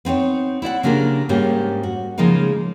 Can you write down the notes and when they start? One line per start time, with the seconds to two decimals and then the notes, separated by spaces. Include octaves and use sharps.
0.05 B3 C4 D#4 C#5
0.62 E4 D5 E5 F#5
0.83 C#3 A#3 D4 F4 G4 A#4
1.29 G#2 G3 A#3 C#4 G4
1.83 F#4
2.18 C#3 F3 G#3 A#3 D#4 A#4